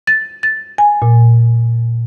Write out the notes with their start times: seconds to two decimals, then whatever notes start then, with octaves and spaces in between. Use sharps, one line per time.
0.07 A6
0.43 A6
0.78 G#5
1.02 A#2